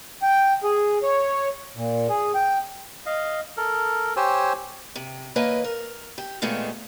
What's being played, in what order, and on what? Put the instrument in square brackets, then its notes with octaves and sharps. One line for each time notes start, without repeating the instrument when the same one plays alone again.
[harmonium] G5
G#4
C#5
A#2
G#4
G5
[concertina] D#5 F5
A4 A#4
G4 C5 C#5 G#5 E6
[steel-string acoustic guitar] C3
E3 A#3 B4 C#5 D#5 G#5
A#4
G4
A#2 D#3 G#3 A3 B3 F4